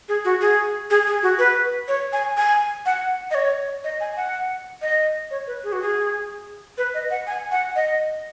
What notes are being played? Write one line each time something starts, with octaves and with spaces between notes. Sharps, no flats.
G#4
F#4
G#4
G#4
G#4
F#4
B4
C#5
G#5
G#5
F#5
D#5
C#5
D#5
G#5
F#5
D#5
C#5
B4
G#4
F#4
G#4
B4
D#5
F#5
G#5
F#5
D#5